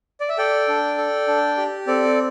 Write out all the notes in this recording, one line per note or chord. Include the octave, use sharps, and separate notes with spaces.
D5
E5
A4 D5 G5
D4
A4
D4
G4
C4 A4 D5